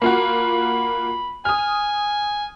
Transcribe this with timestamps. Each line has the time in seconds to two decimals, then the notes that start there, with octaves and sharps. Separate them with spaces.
0.02 A#3 F4 F#4 B5
1.45 G#5 D#6 F6